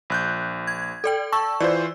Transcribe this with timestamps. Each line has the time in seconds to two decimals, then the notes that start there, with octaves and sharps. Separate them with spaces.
0.10 A#1 F#6 G6
0.67 G#6
1.04 A4 D5 G5
1.32 A5 C#6 E6
1.60 E3 F4 C5 D5